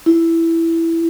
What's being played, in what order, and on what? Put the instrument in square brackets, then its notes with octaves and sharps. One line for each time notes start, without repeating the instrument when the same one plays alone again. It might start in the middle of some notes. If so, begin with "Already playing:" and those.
[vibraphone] E4